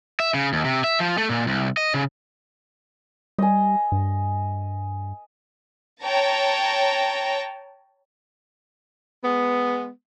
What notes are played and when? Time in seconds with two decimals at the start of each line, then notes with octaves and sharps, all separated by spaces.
0.20 E5
0.34 C#3
0.53 D#2
0.65 C3
0.84 E5
1.00 F3
1.18 A3
1.30 A#2
1.47 C2
1.77 D#5
1.94 C#3
3.38 G3 D#5 G#5
3.92 G2
6.03 C#5 G5 A5 A#5 A#6
9.24 G#3 B3